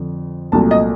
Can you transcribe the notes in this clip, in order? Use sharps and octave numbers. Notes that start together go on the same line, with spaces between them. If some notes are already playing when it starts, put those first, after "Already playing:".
Already playing: F2 D3
C2 A#2 F#3 A3 A5
D#5